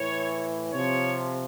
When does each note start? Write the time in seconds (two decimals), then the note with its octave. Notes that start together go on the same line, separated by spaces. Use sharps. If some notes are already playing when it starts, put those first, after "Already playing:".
Already playing: A2 E3 C#5
0.73 C3 F3 C#5